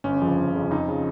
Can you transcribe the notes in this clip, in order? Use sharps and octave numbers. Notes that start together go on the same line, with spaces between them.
G1 C#4
F2 C#3 F3
G1
F2 C#3 F3
F2 D#4
C#3 F3